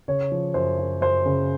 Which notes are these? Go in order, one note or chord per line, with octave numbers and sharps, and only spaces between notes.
C#3 C#5
F3
F#2 C5
F#2
F#2 C5
C#3